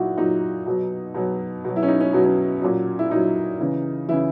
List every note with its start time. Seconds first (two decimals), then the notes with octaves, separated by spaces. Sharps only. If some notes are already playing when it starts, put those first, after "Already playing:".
Already playing: A#2 F#3 D#4 E4 F#4
0.17 A#2 F#3 D#4
0.66 B2 F#3
1.14 B2 F#3
1.65 B2 F#3
1.76 E4
1.83 C#4
1.88 D#4
2.00 C#4
2.13 B2 F#3
2.24 C#4
2.62 A#2 F#3
2.99 E4
3.10 A#2 F#3 D#4
3.60 C#3 E3
4.08 C#3 E3 E4